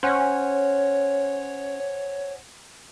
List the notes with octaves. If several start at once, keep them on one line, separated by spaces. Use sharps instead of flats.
C#4 C5 C#5 F#5 G#5